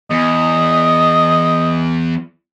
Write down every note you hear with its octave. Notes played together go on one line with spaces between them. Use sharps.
E2 D#5